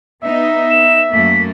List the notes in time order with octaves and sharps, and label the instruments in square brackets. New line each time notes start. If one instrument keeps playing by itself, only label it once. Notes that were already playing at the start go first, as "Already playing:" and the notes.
[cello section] B3 D#4 [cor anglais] E5
[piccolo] E7
[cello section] F#2 A3 A#3 [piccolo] B6